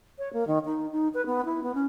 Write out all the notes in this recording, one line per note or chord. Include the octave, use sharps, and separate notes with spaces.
C#5
A#3
D#3
D#4
D#4
B4
B3
E4
B3
C#4